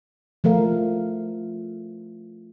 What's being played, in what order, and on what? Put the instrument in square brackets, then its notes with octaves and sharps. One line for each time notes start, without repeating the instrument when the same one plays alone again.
[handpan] F3 A3 A#4 F5